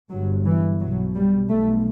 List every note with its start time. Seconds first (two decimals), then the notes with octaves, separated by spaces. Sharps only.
0.10 G1 G2 F#3
0.45 E3
0.80 B1 B2 F#3
1.15 G3
1.49 B1 B2 A3